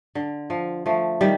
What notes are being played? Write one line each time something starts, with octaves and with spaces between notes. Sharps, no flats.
D3
F3
F3 A3
D#3 G3